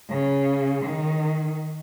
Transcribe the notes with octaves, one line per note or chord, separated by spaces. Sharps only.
C#3
D#3